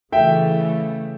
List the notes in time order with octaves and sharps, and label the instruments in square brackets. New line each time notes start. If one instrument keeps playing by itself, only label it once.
[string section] C#3 E3 A3 [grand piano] E5 G5